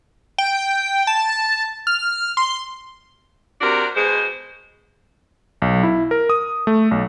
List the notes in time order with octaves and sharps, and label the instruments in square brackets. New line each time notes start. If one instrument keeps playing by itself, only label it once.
[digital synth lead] G5
A5
F6
C6
[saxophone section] C3 D4 F#4 A#4
B2 G#3 C5
[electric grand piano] B1
E4
A#4
D#6
A3
B1